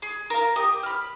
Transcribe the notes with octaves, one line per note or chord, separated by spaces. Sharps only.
G#4
A#4 F5
G4 D#6
B5 F6